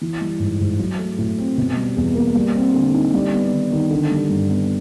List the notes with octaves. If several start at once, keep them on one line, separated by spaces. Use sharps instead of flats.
E3
G3
G#2
G#2
F#3
A3
A2
C4
B2
G3
E2
A#3
G3
C4
D3
D#4
G3
B3
D#3
D#3
D3
G3
G2
B3